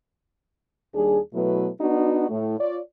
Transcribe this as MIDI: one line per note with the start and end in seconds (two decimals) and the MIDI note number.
0.95 1.18 39
0.95 1.18 55
0.95 1.18 62
0.95 1.18 68
1.34 1.68 47
1.34 1.68 54
1.34 1.68 57
1.34 1.68 59
1.34 1.68 64
1.34 1.68 71
1.81 2.27 59
1.81 2.27 62
1.81 2.27 63
1.81 2.27 66
2.30 2.56 45
2.59 2.78 65
2.59 2.78 73
2.59 2.78 74